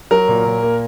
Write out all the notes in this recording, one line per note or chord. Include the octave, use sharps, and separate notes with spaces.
F#3 A#4
A#2
A#2
A#3